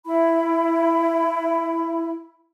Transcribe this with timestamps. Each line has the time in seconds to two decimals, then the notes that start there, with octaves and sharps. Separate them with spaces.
0.05 E4 B5